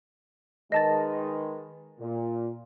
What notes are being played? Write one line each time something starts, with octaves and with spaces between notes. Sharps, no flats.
D#3 G#3 B4 D#5 A5 A6
A#2